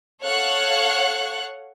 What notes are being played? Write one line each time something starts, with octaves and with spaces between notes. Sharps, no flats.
A4 C#5 F5 F#5 C#6 F#6